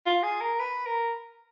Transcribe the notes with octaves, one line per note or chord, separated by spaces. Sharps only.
F4
G#4
A#4
B4
A#4